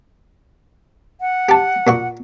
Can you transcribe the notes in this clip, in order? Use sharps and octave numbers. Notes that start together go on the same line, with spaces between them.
F#5
G4 A5
A#2 F#4 C#6